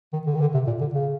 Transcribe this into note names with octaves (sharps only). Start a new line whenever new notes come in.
D#3
D3
D#3
D3
C3
A#2
D3
C#3